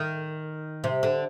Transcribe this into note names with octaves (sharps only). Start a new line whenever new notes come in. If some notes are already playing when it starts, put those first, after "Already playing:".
Already playing: D#3
C3
D3